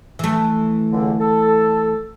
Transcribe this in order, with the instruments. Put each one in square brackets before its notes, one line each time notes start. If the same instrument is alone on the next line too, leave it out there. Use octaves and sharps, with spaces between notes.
[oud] E3 A3
[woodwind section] C#2 D3
A4